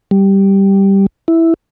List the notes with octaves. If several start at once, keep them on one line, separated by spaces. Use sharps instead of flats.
G3
E4